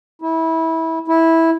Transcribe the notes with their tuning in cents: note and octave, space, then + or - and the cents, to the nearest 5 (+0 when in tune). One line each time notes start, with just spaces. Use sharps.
E4 -25
E4 -10